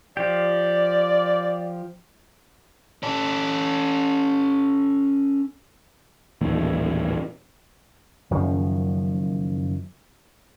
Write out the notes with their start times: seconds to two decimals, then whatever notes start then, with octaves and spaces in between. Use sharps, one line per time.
0.17 F3 G4 D5
3.03 C#4 A4
6.41 D#1 A1 D#2
8.31 F#1 F#2 D#3 F3